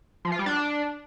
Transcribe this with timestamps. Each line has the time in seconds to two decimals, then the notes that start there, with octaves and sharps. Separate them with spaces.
0.25 F3
0.32 F4
0.39 G3
0.46 D4